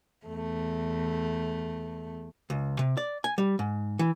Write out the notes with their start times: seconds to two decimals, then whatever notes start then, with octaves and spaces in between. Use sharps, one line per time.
0.25 E2 A3
2.50 C#2
2.79 C3
2.97 D5
3.24 G#5
3.38 G3
3.59 G#2
3.99 E3